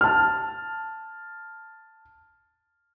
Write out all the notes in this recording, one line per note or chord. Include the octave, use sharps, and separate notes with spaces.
A5 F6